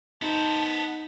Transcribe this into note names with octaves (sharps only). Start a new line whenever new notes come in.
B3 D#4 C5 A5